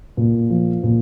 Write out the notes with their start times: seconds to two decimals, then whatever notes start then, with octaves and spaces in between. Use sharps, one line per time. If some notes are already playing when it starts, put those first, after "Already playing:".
0.17 A#2
0.50 F3
0.83 A#2